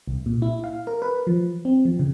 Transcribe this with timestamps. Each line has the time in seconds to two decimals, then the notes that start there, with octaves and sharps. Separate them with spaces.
0.07 C2
0.26 A#2
0.42 E4
0.64 F5
0.87 A#4
1.02 B4
1.27 F3
1.65 C4
1.85 F3
1.99 C#3